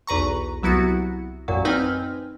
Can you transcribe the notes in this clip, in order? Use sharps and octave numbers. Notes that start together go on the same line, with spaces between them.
B1 E2 B4 A#5 C#6
C2 F#3 B3 E4 F#4 C#7
A1 F#2 A#2 F#3
C4 D#4 B4 G5 G#5 F6